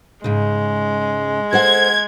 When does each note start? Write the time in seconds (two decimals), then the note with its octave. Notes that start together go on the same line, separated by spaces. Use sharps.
0.24 G#2 C#3 G#3
1.53 A4 C5 F#5 G#6